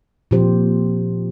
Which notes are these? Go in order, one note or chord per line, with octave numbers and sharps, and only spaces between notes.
A#2 F3 C4 G4 C5